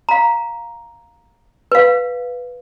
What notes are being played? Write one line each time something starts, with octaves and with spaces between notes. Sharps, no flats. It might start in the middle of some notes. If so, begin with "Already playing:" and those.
F5 A#5
B4 F5